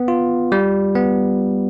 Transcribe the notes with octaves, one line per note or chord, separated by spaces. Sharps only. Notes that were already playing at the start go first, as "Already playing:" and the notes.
Already playing: B3
F4
G3
B3